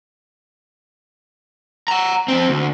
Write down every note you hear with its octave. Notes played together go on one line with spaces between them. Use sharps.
F#5 A#5
F2 C4
D2